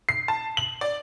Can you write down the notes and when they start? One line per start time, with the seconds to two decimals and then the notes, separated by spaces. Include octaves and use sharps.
0.09 C7
0.28 A5
0.57 F#7
0.81 D5